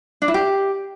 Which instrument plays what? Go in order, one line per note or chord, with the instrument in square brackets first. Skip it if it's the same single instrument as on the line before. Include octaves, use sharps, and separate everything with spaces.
[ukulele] D4
E4
G4